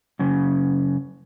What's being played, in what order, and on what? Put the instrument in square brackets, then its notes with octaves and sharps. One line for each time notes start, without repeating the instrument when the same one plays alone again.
[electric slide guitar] F#2 C#3